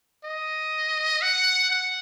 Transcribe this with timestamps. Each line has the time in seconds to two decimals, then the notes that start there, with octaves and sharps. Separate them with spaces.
0.24 D#5
1.22 F#5
1.70 F#5